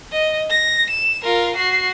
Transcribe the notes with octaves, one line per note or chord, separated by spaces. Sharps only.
D#5
A#6
E7
F4 A#4
F#4 C7